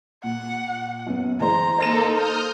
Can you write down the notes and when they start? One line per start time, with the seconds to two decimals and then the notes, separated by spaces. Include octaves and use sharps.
0.24 A#2 F#5
1.07 F#2 B3
1.40 E3 G#3 C5 A#5
1.78 A#3 D#4 A4 C5 A#6 E7
2.13 D#6 F6 G6